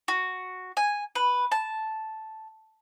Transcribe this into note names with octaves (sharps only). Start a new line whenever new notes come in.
F#4
G#5
B4
A5